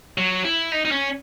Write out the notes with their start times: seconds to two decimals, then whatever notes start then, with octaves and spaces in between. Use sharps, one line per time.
0.18 F#3
0.45 E4
0.72 D#4
0.85 D#4
0.91 C#4